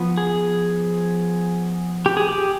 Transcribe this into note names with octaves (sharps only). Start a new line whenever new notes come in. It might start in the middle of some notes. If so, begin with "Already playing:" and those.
Already playing: F3 B3
G#4
G4
G#4
G4